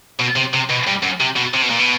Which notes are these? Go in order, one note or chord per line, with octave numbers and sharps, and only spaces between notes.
B2
C3
C3
B2
G2
F#2
C3
B2
C3
B2
A#2
B2